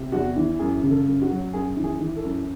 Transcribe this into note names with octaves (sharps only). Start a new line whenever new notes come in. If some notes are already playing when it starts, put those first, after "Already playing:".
Already playing: C3
E2 F#4
E3
F#2 G#4
C#3
A4
F#2
F#4
F#3
F#2 G#4
E3
G#4
E3
A4
F#2